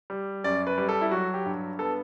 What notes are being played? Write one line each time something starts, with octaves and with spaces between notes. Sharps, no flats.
G3
F#2 D5
B4
G3
A4
E4
F#3 F#4
G4
G2
B3 A4